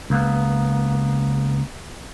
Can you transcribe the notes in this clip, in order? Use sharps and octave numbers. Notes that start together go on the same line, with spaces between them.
C#2 A#3 B3